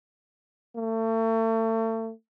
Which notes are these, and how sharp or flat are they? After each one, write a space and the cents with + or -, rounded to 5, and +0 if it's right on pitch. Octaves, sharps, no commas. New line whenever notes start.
A3 +35